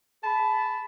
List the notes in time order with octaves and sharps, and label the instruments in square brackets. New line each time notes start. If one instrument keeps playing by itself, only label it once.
[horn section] G#4 A5 B5